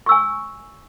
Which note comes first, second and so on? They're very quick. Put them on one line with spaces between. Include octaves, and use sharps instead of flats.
C#6 E6 G#5